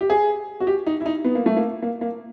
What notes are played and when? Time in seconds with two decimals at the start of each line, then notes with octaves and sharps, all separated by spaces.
0.01 G4
0.10 G#4
0.60 F#4
0.67 G4
0.87 D#4
1.00 E4
1.06 D#4
1.25 B3
1.35 A#3
1.46 A3
1.57 A#3
1.82 A#3
2.01 A#3